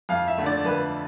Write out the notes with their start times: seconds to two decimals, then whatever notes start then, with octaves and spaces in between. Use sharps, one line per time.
0.09 F2 F5
0.28 E5
0.38 D3 A3
0.46 D5
0.65 F2 B4